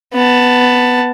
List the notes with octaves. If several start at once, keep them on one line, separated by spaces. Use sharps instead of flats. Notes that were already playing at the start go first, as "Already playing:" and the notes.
B3 A5